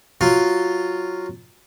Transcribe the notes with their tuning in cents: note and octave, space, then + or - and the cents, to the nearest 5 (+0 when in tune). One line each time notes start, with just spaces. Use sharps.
F#3 +0 F4 +0